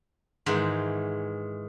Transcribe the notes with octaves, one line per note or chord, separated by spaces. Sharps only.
G#2 D#3 E3 C5 F#5